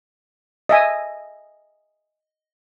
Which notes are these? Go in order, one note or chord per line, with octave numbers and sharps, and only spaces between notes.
D#5 E5 G#5